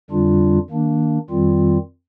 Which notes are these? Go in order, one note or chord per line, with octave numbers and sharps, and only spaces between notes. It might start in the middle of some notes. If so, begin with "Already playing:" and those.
F2 D3 G3 D4 F4
D#3 A#3 D4
F2 D#3 G3 C4 F4